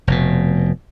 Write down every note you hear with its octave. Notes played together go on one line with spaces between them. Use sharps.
F1 B2